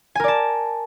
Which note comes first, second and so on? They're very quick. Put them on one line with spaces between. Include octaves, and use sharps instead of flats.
G#5 A#4 D5 A5